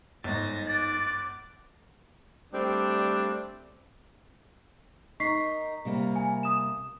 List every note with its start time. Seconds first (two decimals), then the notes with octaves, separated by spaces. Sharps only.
0.24 G1 G#2 D#5 A6 A#6
0.67 D6 F#6 A6
2.54 G3 A3 C4 D4
5.20 D#4 A#4 C#6 B6 C7
5.85 C3 G3 A#3
6.16 G#5
6.43 D#6 E7